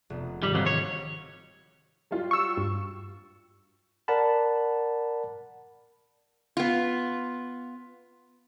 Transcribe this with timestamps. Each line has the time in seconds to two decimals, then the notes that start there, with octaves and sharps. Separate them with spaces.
0.10 F1 B3
0.43 G#2 D#3 G3
0.55 F2 F#3
0.66 C#5
2.11 F#3 G3 F4
2.31 C#6 E6
2.57 G2
4.08 A#4 D5 F#5 A5 B5
6.57 B3 F4